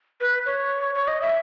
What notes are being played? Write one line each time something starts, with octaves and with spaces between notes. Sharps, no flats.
B4
C#5
C#5
D#5
E5